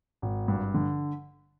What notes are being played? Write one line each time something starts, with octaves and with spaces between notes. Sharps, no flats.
G#1
G2
D3